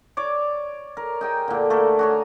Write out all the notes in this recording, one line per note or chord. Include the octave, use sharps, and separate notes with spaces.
C#5 D5 D6
A#4
D#4 G#4 G5
A#2 D3
A3 A#3 F#4 A4
F#4 G#4 C#5